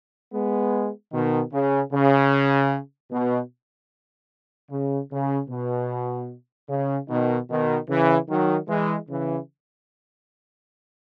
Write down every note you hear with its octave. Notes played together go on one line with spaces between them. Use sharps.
G#3 B3
B2 D#3
C#3
C#3
B2
C#3
C#3
B2
C#3
B2 D#3
B2 D#3
C#3 E3
D#3 F#3
E3 G#3
C#3 E3